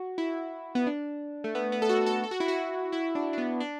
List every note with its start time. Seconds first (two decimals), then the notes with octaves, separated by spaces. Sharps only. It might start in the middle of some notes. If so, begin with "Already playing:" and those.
Already playing: F#4
0.18 E4
0.75 B3
0.87 D4
1.44 A3
1.55 B3
1.72 B3
1.82 A4
1.89 F#4
2.06 A4
2.24 A4
2.31 F#4
2.40 E4
2.48 F#4
2.92 E4
3.15 D4
3.33 D4
3.38 B3
3.60 D4